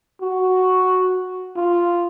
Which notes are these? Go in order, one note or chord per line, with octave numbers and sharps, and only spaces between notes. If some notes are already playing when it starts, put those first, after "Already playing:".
F#4
F4